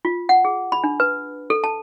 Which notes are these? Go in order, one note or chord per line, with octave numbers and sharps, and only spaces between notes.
F4
F#5
G#4
B5
D4
B4
A4
A5